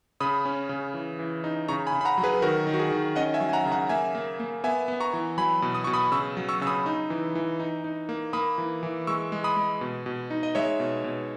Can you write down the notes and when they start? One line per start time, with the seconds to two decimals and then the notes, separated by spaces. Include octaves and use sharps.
0.20 C#3 B5 D#6
0.45 C#4
0.69 C#3
0.94 E3
1.19 E3
1.44 D#4
1.68 C#3 A#5 C#6
1.87 G#5 B5
1.92 C#3
2.01 B5
2.05 F#5 A#5
2.18 F#3
2.23 G#4 B4
2.42 D#3 F#4 A#4
2.67 D#3
2.73 F#4
2.79 G#4
2.92 D#3
3.16 C#4 D#5 F#5
3.34 E5 G#5
3.40 F#3
3.49 G#5
3.53 F#5 A#5
3.66 C#3
3.72 F#5 A#5
3.89 A#3 E5 G#5
4.15 A#3
4.40 A#3
4.64 B3 E5 G#5
4.88 B3
5.00 A#5 C#6
5.13 E3
5.38 F#3 G#5 B5
5.62 B2
5.75 D#6
5.84 B2 C#6
5.94 B5 D#6
6.12 C#3 C#6 E6
6.37 F#3
6.49 C#6 E6
6.61 C#3 E6
6.67 B5 D#6
6.86 D#4
7.10 E3
7.35 E3
7.60 D#4
7.84 D#4
8.09 A#3
8.33 A#3 B5 D#6
8.58 E3
8.83 E3
9.07 G#3 C#6 E6
9.32 G#3
9.44 B5 D#6
9.57 G#3
9.81 B2
10.06 B2
10.31 D#4
10.43 D#5
10.55 G#3 C#5 E5
10.80 B2
11.04 B2